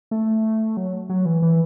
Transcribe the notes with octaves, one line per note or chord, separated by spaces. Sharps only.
A3
F#3
F#3
E3
E3